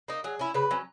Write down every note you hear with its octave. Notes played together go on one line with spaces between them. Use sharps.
A#3 D#4
F#3 G#4
C#4 E4
C#3 B4
F#3 C#4